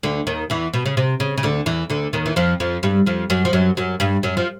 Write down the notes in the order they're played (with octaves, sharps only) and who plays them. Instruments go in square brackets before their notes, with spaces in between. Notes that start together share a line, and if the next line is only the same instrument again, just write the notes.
[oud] D2 D3
D#2 D#3
E2 E3
B2
C#3
C3
C#3
C#3
D2 D3
E2 E3
D2 D3
D#2 D#3
E3
F2 F3
F2 F3
G2 G3
F2 F3
F#2 F#3
F3
F#2 F#3
F#2 F#3
G2 G3
F#2 F#3
F3